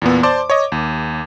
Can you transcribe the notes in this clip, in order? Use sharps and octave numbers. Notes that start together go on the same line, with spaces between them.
E2 A#2 B3
C5 D5 A5 C6 D6
C#5 D#5
D#2